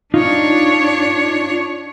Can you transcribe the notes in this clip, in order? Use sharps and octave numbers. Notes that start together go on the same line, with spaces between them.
D4 D#4 F4 C#5